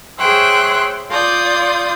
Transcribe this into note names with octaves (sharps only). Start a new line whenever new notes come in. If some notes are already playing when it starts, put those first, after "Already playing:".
G#4 C5 C#5 E5 G5 F#6
F4 D5 D#6 G6